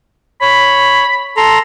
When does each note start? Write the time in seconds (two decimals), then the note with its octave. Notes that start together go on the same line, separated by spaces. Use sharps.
0.41 C#5 B5
1.37 A4 A#5 C6